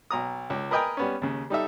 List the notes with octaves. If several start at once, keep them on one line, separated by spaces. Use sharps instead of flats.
B1 A#5 D#6
C#2
A#4 B4 D#5 G5 G#5 A#5
G3 B3 C#4
D#2 C#3
G3 D#4 A4 E5